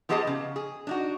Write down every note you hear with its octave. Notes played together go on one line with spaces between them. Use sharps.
F3 B3 G4 G#4 D#5 A5
C#3
G#4
D4 D#4 F#4